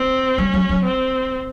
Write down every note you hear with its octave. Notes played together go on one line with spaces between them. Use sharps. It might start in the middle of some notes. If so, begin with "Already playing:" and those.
Already playing: C4
G3 C#4
F#3
F#3
C4